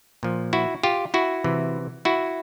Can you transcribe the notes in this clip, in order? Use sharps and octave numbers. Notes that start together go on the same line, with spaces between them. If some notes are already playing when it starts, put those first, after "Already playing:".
A#2 F3
E4 F#4
F4 G4
E4 F#4
C3 E3
E4 F#4